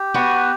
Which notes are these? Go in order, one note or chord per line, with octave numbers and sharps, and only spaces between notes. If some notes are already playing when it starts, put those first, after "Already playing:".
Already playing: G4
B3 F#4